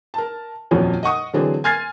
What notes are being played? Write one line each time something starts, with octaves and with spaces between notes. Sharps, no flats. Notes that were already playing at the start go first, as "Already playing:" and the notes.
A#4 A5
D#1 F2 A#2 F3 C#4 F#4
D#5 F#5 C#6 D#6
D3 E3 F#3 C4 D4 G#4
G#5 C6 F6 G#6 A6 C7